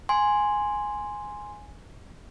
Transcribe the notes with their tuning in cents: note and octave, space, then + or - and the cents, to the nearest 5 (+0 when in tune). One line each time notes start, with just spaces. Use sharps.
G#5 +0 C6 +0